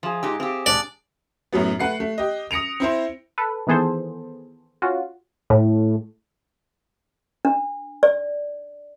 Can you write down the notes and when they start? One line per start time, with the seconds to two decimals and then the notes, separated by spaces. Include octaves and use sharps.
0.03 F3 F4 G#4
0.23 G#2 D#4 G4 E6
0.40 C4 G4 F5
0.66 D4 D5
1.53 F#2 A2 F#3 B3
1.79 A3 B4 F#5 F#6 C7
2.00 A3
2.18 G4 D#5
2.51 D#6 A#6 C#7 D7 F7
2.80 C4 E4 C5
3.38 A4 B4
3.67 D#3 E3 B3 G#4 A4 C5
4.82 C#4 F4 F#4
5.50 A2
7.45 D4
8.03 D5